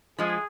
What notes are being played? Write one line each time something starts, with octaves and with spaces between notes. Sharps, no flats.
F3 G#3 G#4